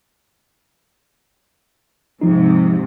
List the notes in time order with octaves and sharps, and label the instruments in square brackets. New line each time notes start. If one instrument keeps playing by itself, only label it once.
[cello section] G#2 C3 [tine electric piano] F3 D#4